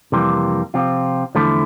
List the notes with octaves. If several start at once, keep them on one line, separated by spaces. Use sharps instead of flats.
F2 C3 E3 G3 A#3
C3 F3 C4 F4
E2 D3 F3 A3 E4